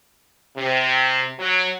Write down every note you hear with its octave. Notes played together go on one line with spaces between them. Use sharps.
C3
F#3